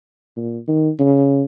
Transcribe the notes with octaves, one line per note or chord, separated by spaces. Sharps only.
A#2
D#3
C#3